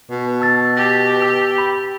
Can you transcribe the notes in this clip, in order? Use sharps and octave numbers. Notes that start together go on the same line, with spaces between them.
B2
A5 E6 A6
G4 A#6
E6
B5